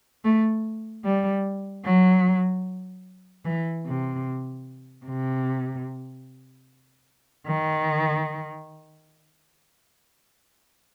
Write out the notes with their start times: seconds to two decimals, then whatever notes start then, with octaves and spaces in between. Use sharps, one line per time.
0.24 A3
1.04 G3
1.84 F#3
3.45 E3
3.85 C3
5.06 C3
7.46 D#3